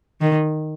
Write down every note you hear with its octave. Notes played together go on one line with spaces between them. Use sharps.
D#3